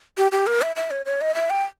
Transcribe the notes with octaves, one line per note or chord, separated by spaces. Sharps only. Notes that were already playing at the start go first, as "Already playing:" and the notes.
G4
G4
A#4
E5
E5
C#5
C#5
D#5
E5
G5